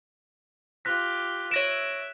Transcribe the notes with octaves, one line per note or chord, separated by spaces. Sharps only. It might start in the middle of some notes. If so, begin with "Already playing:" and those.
F4 G4 F#6 A#6 B6
C#5 E5 A#6 D7 E7